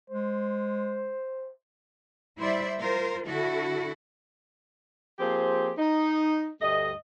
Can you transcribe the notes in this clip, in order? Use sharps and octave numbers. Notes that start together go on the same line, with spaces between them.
G#3 C5
G3 E4 C5 D5 E5
F4 A#4 C5
D3 E4 F#4 A4
F3 A#3 C4 G4 G#4 C5
D#4
D2 G2 A3 D#5